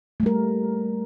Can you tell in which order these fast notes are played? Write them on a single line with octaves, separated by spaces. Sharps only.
A3 G3 A#4